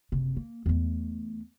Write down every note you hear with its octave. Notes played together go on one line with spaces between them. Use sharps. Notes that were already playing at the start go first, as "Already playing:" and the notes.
F#1 C3
A#3
E2 A3